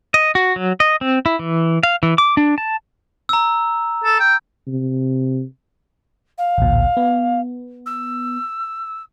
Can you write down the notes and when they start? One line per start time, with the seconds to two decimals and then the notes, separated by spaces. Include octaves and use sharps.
0.14 D#5
0.35 F#4
0.56 F#3
0.80 D#5
1.01 C4
1.26 E4
1.39 E3
1.83 F5
2.03 E3
2.18 D6
2.37 D4
2.58 A5
3.29 A#5 E6
4.04 A4
4.20 G5
4.67 C3
6.38 F5
6.58 A1 D2 A#2
6.97 B3
7.86 E6